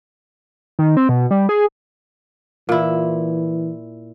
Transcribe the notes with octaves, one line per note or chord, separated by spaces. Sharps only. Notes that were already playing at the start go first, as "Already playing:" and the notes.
D#3
C4
B2
G3
G#4
A#2 E3 E4